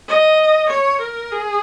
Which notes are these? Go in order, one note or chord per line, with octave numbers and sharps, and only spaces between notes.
D#5
C#5
A#4
G#4